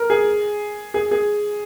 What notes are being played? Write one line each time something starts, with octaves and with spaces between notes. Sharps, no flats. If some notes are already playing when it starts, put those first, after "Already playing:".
Already playing: A#4
G#4
G#4
G#4